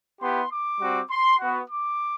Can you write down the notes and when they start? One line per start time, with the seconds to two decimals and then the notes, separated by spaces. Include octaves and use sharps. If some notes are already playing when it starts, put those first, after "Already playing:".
0.20 B3 E4 G4 C6
0.51 D6
0.80 G3 C4 F#4
1.10 C6
1.39 B3 F#4
1.68 D6